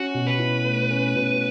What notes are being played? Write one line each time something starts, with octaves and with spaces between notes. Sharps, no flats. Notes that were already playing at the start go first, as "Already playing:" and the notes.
Already playing: C#4 F#4
B2
B4
E4
A3
C#4
B2